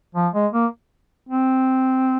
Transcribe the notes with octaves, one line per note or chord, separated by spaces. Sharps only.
F3
G#3
A#3
C4